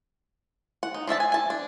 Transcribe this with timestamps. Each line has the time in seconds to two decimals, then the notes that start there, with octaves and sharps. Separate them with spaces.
0.83 F#5
0.94 D#4
1.07 F3 D4 E5 A5
1.20 G#5
1.32 G#5 A5
1.50 D4